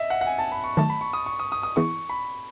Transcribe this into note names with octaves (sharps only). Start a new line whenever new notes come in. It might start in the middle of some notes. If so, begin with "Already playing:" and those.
Already playing: D#5 E5
F#5
F#5
G#5
A5
B5
C#6
D#3 F#3 A3 A5
B5
C#6
D#6
C#6
D#6
D#6
D#6
E3 B3 E4 G#4 C#6
B5